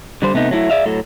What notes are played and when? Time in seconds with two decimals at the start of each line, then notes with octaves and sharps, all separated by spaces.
0.22 D3 G3 C5
0.34 C3 A3 B3 D#4
0.51 F#3 A3 E4
0.70 G#4 D5 E5 F5
0.86 A2 F#3 A4